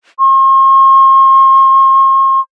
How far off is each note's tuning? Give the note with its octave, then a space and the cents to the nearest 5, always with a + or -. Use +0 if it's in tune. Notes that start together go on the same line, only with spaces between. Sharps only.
C6 +45